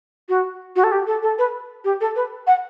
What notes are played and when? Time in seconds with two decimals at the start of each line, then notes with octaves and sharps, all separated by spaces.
0.29 F#4
0.76 F#4
0.84 A4
0.92 G4
1.07 A4
1.22 A4
1.38 B4
1.84 G4
2.01 A4
2.16 B4
2.47 F#5